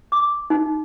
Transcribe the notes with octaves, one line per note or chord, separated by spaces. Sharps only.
D6
D#4